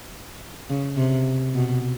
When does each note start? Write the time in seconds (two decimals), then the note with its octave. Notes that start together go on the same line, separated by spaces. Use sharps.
0.70 C#3
0.97 C3
1.54 B2